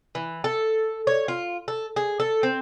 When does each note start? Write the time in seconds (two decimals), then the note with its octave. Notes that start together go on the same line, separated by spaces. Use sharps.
0.15 E3
0.44 A4
1.07 C#5
1.28 F4
1.68 A4
1.96 G#4
2.20 A4
2.43 C4